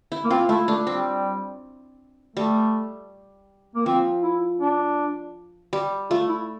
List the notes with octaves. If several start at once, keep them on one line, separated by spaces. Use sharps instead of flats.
E4
A#3
C4 F4
A3 E4
A3 D4
G3 C4
G3 A3
A#3
F3 C4
E4
D4
G3
A3 F4
E4